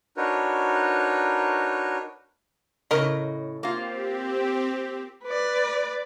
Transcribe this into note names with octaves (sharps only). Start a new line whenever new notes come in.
D4 D#4 F#4 A#4 B4 C#5
A2 C#3 A#4 D#5
A#3 C4 F4 G4
B4 D5